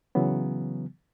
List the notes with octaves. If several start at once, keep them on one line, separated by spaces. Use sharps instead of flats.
C#3 E3 F#3 B3